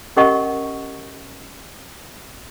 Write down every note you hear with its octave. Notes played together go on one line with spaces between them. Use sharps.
C#4 G4 A#4 D#5 F#5 C#6